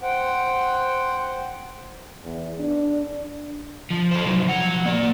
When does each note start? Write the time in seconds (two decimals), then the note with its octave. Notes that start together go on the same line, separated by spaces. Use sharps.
0.01 C5 F#5 G5
2.25 E2
2.60 D4
3.91 F3
4.12 A4 C5
4.26 C3 F#3
4.47 F3 F#5
4.86 A#3 D5